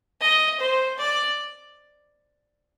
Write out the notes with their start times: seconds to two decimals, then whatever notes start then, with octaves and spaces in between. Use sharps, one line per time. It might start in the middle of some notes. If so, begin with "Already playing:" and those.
0.21 D#5
0.60 C5
0.98 D5